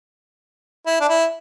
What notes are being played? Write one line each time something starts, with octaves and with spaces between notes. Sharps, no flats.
E4
D4
E4